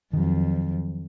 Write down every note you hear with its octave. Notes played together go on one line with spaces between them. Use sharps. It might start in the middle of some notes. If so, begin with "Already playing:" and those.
F2 D#3 F#3